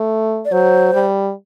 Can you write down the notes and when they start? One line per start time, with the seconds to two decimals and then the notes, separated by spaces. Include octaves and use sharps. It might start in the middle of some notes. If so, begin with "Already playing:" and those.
Already playing: A3
0.45 D5
0.52 F#3 C5
0.94 G3